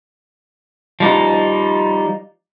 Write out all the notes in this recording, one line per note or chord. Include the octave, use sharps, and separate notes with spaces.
F3 G3 D#4